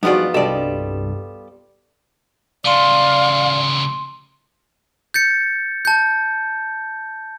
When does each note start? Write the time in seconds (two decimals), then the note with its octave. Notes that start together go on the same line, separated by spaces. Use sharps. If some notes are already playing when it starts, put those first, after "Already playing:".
0.03 G2 F3 B3 D#4 F4 F#4 G#4 D5
0.34 C2 G2 G3 A4 D5 D#5
2.65 C#3 A3 D5 F5 C6 D#7 G7
5.14 G6 A6 C#7
5.85 A5 G6